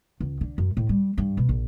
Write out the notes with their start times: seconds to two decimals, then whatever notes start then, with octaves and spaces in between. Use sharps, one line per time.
0.20 C#2
0.41 D3
0.58 F#2
0.77 A2
0.89 G3
1.18 G2
1.37 B2
1.49 A#1